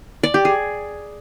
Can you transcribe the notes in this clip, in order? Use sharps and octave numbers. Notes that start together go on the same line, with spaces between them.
D5
G4
G#4